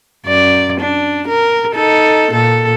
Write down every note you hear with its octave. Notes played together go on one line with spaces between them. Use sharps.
F#2 D5
D4
A#4
D#4 A4
A#2 A4